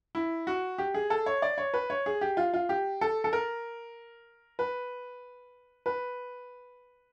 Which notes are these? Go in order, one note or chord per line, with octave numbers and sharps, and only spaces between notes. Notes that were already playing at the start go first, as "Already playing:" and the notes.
E4
F#4
G4
G#4
A4
C#5
D5
C#5
B4
C#5
G#4
G4
F4
F4
G4
A4
A4
A#4
B4
B4